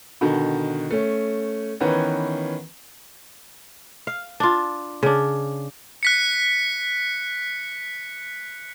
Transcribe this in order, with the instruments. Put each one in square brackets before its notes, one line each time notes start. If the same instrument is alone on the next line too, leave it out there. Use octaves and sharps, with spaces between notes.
[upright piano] B2 D3 D#3
A3 C#4
D#3 E3 B3 C#4
[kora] F5
D4 F4
C#3 D4
[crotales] F#6 B6 C#7